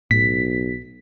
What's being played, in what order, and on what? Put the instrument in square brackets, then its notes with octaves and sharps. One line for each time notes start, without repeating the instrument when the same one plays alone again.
[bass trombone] B1 [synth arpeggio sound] A2 [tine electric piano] B6